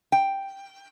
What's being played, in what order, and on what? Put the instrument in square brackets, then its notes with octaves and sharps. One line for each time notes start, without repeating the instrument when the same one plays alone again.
[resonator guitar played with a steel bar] G5